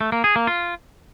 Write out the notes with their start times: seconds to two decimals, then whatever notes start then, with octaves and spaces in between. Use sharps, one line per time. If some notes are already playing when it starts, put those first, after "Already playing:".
0.01 A3
0.12 A#3
0.24 G#4
0.36 A#3
0.47 F4